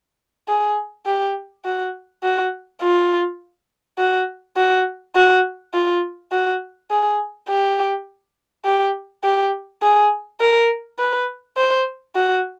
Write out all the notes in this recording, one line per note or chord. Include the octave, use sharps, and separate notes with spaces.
G#4
G4
F#4
F#4
F4
F#4
F#4
F#4
F4
F#4
G#4
G4
G4
G4
G#4
A#4
B4
C5
F#4